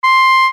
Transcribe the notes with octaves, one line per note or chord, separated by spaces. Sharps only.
C6